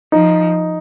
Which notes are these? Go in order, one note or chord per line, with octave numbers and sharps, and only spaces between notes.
F3 D#4